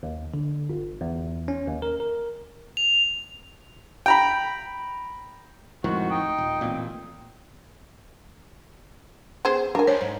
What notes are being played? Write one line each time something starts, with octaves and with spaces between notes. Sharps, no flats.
D#2
D3
G1
E2
C#4
D#2
A#4
A#4
F7
G5 A#5 B5
F2 A2 D#3 G#3 F#4
D#4 G5
D#1
A1 A#2 C4
B3 G#4 C5
D4 A#4 G#5
C5 C#5
G#2